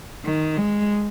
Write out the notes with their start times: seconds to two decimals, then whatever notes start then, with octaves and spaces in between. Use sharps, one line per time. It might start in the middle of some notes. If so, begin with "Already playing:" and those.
0.25 D#3
0.57 G#3